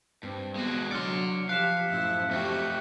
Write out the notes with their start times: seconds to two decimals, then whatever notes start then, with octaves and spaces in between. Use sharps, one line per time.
0.23 G2 C4
0.56 G#3 B3 F#4
0.91 D3 F#3 D5 C6 F6 C#7
1.49 F3 G4 F5 F#6 B6 E7
1.90 F#2 A2 E4
2.31 A3 C4 F#4 G4